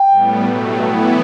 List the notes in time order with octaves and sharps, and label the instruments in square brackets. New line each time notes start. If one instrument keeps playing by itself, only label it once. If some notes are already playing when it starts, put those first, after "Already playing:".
Already playing: [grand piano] G5
[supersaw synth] A2 G3 B3
B2 F#3 A3
E3 B3 E4